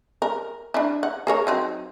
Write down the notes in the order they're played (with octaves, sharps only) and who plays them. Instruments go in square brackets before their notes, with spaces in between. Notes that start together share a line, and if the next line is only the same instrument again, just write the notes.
[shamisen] A#4
D4 E4
F#5
G#4 A#4 C#5
F#3 C4 D#4